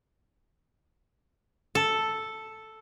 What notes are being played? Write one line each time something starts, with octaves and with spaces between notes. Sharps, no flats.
A4